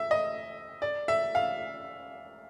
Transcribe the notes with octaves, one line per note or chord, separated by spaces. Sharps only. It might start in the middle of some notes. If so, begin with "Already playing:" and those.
Already playing: E5
D#5
D5
E5
F5